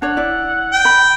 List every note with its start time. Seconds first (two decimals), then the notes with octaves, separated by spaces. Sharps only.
0.02 D4 C#5 F#5
0.17 E4 D5
0.72 G5
0.85 B5